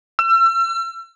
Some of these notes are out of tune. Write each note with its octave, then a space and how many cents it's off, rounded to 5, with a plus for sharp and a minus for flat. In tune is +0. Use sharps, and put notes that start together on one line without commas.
E6 +40